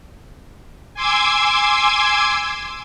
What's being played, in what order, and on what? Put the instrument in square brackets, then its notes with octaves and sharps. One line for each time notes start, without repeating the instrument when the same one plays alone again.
[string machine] G#5 C6 D6 E6 G#6